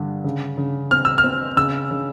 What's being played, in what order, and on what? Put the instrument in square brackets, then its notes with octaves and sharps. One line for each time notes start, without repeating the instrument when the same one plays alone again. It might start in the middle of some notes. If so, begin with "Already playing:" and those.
Already playing: [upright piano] G2 D3
C#3
C#3
[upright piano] C4 [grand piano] F6
[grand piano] E6
F6
[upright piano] C4
[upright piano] C#3 [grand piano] E6
[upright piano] C#3